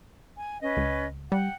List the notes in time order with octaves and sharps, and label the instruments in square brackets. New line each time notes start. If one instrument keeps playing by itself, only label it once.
[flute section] G#5
C#4 B4 D#5
[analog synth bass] C#2
[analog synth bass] G3 [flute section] F#5 G5